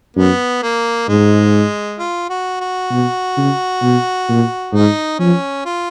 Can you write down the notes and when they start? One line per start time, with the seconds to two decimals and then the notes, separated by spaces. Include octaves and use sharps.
0.16 F#2 B3
0.63 A#3
1.09 G#2 G#3
1.99 F4
2.30 F#4
2.61 F#4
2.91 B2
3.37 C#3
3.82 B2
4.29 A#2
4.73 G#2 D#4
5.19 F3 C#4
5.65 F4